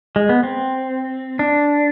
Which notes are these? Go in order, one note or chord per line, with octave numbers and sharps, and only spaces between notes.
G#3
B3
C4
D4